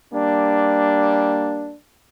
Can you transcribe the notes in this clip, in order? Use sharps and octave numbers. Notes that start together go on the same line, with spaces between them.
G3 A#3 D4